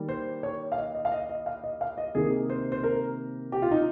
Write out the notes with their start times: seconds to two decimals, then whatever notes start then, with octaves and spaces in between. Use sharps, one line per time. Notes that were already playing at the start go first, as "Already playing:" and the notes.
Already playing: D#3 G3 A#3
0.09 C5
0.43 C#5
0.72 F5
0.78 D#5
0.94 D#5
1.05 F5
1.12 D#5
1.29 D#5
1.46 F5
1.64 D#5
1.81 F5
1.98 D#5
2.15 C3 D#3 A#3 G#4
2.50 C5
2.72 C5
2.83 A#4
3.52 G4
3.62 F4
3.71 D#4